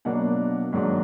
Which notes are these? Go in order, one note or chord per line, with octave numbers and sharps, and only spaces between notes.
B2 F#3 A#3 D4 F#5
G#2 D#3 F#3 A#3 D4